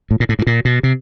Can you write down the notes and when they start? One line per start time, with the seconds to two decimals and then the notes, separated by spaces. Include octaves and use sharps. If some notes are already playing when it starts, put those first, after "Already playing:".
0.11 A2
0.20 A#2
0.29 A2
0.39 G#2
0.47 A#2
0.65 B2
0.83 C3